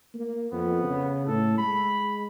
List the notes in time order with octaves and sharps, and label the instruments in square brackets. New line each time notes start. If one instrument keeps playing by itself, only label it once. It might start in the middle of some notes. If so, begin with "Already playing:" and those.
[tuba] A#3
[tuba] F2 [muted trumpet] B3
[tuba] C#3
[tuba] A2 [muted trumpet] A4
[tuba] G#3 [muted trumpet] B5